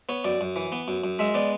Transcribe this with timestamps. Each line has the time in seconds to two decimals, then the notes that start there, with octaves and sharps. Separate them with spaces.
0.09 B3 C#5
0.24 F#2 D5
0.41 F#2
0.56 E3
0.72 B3
0.88 F#2
1.04 F#2
1.19 G#3 E5
1.34 B3 D5